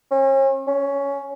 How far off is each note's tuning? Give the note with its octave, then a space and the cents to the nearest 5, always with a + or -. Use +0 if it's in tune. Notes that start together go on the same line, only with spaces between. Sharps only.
C#4 -40
C#4 +10